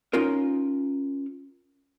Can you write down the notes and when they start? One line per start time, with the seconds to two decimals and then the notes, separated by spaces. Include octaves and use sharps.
0.13 C#4 D#4 F4 A#4